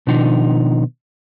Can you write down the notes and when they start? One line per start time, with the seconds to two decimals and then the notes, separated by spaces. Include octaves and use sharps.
0.07 B2 D#3 F3 D4 D#4